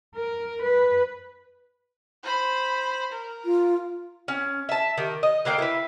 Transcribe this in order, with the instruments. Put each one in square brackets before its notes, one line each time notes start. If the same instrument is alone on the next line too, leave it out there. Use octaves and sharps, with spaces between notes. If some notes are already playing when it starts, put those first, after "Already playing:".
[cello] A#4
B4
[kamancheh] C5 B5
A#4
[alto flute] F4
[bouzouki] C#4
E5 A5
D#3 G4
D#5
D3 A#3 F5 G5
E4 B4